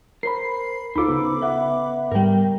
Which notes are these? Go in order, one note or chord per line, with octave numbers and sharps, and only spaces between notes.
A#4 C5 B5 C7
D2 D#4 F4 A4 C5 B5 D6
C#3 B3
B4 E5 F#5
G#2 G3 A#4 G5